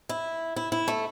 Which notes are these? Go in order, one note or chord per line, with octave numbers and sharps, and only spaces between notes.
E4
E4
E4
A3